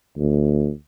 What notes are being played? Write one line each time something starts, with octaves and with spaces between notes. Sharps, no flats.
D2